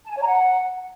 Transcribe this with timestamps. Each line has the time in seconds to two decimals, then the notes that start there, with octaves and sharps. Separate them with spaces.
0.05 A5
0.10 G#5
0.16 C#5
0.21 A#5
0.27 F#5